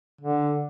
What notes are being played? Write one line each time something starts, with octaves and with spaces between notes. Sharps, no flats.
D3